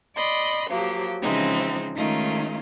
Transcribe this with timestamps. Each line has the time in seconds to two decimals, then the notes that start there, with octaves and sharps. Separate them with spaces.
0.16 D5 D#5 B5 C6
0.70 F3 F#3 A#3 G4
1.22 C#3 E3 F3 G#3 C4 D#4
1.96 D#3 G#3 A3 C#4 D#4 F4